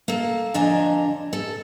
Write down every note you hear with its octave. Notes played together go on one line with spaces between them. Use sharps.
A#3 A4
F2 D3 D4 D#5 G#5 A#5
A4